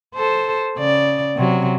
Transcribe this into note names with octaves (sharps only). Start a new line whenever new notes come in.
A4 C5
C#3 D5
C3 F#3